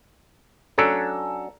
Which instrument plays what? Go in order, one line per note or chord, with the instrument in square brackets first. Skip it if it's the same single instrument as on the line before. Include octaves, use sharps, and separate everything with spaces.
[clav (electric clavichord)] F#3 C#4 D4 [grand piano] A4 A#5 E6